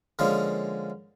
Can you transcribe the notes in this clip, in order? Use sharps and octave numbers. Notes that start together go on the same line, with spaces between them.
D3 F3 G#3 A#3 C#4